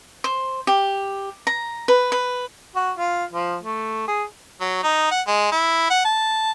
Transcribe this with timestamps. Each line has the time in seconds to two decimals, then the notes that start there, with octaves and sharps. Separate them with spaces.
0.24 C5
0.67 G4
1.47 A#5
1.88 B4
2.12 B4
2.76 F#4
2.98 F4
3.32 F3
3.62 A3
4.08 G#4
4.61 F#3
4.83 D#4
5.11 F#5
5.27 G#3
5.52 E4
5.90 F#5
6.05 A5